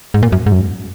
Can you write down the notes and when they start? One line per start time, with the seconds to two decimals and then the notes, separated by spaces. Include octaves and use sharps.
0.14 G#2
0.23 A#2
0.32 F#2
0.46 G#2
0.52 F#2